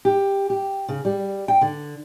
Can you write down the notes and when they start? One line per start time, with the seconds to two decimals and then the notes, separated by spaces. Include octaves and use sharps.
0.05 G4
0.50 G4
0.88 C#3
1.05 G3
1.48 G5
1.61 D3